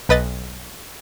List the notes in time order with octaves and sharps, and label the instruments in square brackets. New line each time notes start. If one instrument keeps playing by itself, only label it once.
[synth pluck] B1 B4 D#5 A6